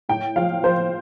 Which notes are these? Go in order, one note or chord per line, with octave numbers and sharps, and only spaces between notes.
A2 G5
F3 F5
F3 C5